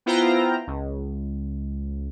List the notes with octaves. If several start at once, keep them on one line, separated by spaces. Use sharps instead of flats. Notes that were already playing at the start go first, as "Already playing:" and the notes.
B3 E4 F4 C5 G5 A#5
C#2